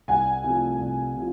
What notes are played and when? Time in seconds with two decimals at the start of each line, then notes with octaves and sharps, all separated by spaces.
0.08 C2 F#5 G#5
0.44 C3 F3 A3
0.79 C2
1.15 C3 F3